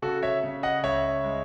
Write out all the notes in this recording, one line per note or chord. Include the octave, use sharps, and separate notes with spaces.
C#3 F#4 A4
C#5 E5
C#3
D#5 F#5
C#2 C#5 E5
G#3